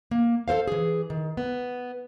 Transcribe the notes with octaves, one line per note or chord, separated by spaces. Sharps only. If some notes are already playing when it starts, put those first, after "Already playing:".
A#3
A4 A#4 C5 F5
E3 G#4
D#3
B3